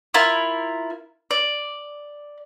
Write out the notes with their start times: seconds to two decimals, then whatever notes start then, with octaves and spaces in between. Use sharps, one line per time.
0.14 E4 F4 A#4
1.31 D5